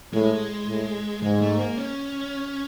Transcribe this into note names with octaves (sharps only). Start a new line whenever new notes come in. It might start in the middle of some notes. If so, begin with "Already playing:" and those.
A2 G#3
A2
G#2 G#3
A3
A#3
C#4